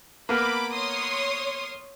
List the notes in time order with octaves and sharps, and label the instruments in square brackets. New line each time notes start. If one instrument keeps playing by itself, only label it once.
[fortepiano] A#3 B3 A#4 [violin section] B5 D6
[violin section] C#5 C6 D#6